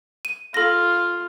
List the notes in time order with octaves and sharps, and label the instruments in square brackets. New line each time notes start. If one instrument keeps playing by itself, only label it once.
[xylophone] D#7
[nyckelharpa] F4 [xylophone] A4 A#6